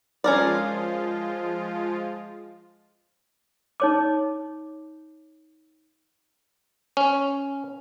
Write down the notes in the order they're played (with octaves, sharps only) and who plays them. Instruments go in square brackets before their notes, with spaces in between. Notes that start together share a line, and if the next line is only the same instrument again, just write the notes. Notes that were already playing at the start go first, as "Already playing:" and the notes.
[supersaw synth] F3 G#3 F4 [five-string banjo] C#4 A#4 D5
[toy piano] D#4 C#5 D6
[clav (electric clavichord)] C#4